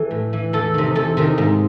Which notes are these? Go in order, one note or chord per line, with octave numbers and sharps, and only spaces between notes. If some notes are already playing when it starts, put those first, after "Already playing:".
Already playing: E3 A4
A2
E3
E2 A4
C3 D#3
E2 A4
C3 D#3
G#2